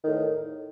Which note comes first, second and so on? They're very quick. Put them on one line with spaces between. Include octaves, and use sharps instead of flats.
D#3 A2 E2